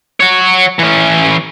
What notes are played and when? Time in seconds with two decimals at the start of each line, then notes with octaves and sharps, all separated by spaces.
0.20 C#5 F#5
0.79 E3 C#4